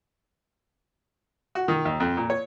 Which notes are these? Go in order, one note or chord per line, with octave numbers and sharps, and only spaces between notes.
F#4
D#3
D#2
F2
A#2
C#5